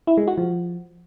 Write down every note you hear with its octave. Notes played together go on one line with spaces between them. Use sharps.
E4
G#3
F#4
F3